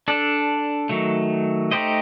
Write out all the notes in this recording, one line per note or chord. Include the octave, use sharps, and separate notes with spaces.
D4 A4 D5
D#3 F#3 A3
A3 D#4 G4 C5 D#5